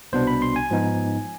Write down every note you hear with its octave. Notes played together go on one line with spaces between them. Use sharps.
C2 B2 B3 D4 C5
B5
C6
G#5
G#2 F3 B3 D#4